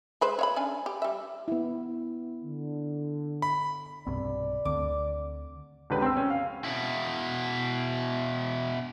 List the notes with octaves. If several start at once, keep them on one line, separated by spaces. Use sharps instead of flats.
G#3 B4 C5
C#5 F5 B5
C#4 D4 G#5
G4
G3 E5
B3 E4
D3
B5
B1 G2 C3 C4 D5
D2 D3 C4 D6
C#2 D3 G4 B4
C4 E6
C#4
F5
B2 E4